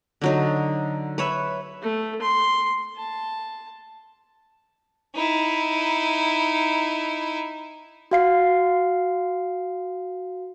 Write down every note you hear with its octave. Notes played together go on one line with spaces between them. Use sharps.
D3 F#3 D#4
B4 C#5 E5
A3
C6
A5
D#4 E4
F#4 F5 C7